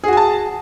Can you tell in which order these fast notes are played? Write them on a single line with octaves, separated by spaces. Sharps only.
G#4 F#4 G#5 A5